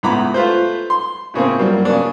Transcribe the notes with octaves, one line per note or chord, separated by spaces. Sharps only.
C#2 A2 B3 A#5 B5 D6
A3 F4 B4 C5
C6
A2 C#3 A#3 C4
G2 F#3 A#3
C#3 A#3 D4